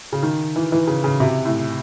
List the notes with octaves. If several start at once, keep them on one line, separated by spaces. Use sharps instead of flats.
C#3
D#3
E3
E3
C#3
C#3
C3
A2